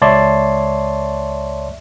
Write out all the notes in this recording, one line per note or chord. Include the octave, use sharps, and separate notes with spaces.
C#2 C#5 D5 E5 A5 C6